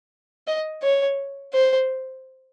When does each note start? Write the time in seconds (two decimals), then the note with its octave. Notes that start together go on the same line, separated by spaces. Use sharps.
0.47 D#5
0.83 C#5
1.53 C5